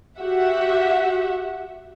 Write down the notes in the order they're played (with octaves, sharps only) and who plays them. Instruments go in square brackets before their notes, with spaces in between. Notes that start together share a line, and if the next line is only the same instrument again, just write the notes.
[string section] F#4 G4 E5 F#5